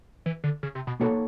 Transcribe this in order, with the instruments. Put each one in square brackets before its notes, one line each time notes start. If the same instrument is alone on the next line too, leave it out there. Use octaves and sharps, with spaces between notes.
[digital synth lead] E3
D3
C#3
C3
B2
[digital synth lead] B2 [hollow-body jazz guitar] A#3 D#4 F#4 A4 C#5